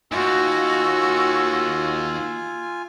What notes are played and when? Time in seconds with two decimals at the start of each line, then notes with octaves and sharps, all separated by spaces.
0.12 D#2 F4 F#4 G#5 E6